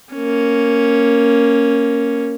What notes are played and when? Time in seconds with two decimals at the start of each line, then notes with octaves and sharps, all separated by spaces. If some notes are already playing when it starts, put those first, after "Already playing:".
0.15 A#3 C#4